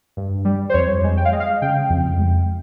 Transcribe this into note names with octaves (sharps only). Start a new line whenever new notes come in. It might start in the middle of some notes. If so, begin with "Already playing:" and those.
G2
G3
C5
F2 C#5
G#3
G5
F5
G#3 D#5
F5
C#3 G5
F2
G#3